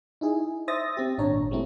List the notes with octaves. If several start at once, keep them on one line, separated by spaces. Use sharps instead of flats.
D#4 E4 G#4
C5 E5 D#6 A6 A#6
C4 G4
G#1 A#2 D4 C#5 A#5
G3 A3 C4 E4